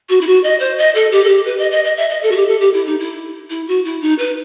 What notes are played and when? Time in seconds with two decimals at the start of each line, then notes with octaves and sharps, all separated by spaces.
0.09 F#4
0.21 E4
0.27 F#4
0.44 D#5
0.60 C5
0.78 D#5
0.95 A4
1.11 G4
1.24 A4
1.29 G4
1.46 B4
1.58 D#5
1.71 D#5
1.84 D#5
1.97 E5
2.09 D#5
2.23 A4
2.31 F#4
2.36 G4
2.48 A4
2.60 G4
2.74 E4
2.86 D#4
2.99 E4
3.50 E4
3.68 F#4
3.85 E4
4.01 D#4
4.19 B4